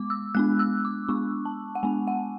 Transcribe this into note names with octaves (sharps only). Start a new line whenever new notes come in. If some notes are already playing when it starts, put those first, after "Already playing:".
Already playing: G#3 B3 D6
E6
G#3 B3 D4 F#6
E6
D6
G#3 B3 D4 C#6
A5
F#5
G#3 B3 D4 G#5
F#5